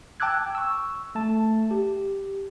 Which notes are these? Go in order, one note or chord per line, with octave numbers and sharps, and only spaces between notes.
G5 A5 D6 E6 F#6 G#6
C#6 E6
A3 A5
G4